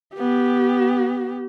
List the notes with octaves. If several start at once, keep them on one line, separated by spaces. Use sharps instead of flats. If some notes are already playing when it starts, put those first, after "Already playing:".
B3 G4